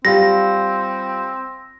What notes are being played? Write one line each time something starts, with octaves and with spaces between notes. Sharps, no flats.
G3 C4 F4 A#6